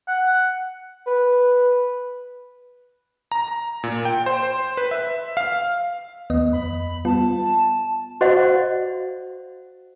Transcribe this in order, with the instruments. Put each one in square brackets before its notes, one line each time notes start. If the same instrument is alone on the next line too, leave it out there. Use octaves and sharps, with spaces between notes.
[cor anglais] F#5
[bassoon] B4
[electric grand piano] A#5
A#2
G5
C5
B4
E5
F5
[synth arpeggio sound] D#2 B3 D#5
[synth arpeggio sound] F2 [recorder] B5
[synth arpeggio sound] G3 B3 F4 [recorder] A5
[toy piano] F#4 C5 D5 D#5 F5 F#5